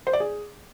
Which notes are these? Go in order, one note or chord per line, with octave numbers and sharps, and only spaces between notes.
C5
D5
G#4